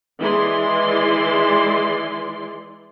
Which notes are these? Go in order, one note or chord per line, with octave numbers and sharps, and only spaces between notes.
E3 G#3 E4 D5 C6